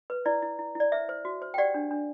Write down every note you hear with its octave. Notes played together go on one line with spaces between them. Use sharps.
B4
E4 D5
E4
E4
E4 D5
C5 E5
C5
F#4
C5
G5
G4 D5 F#5
D4
D4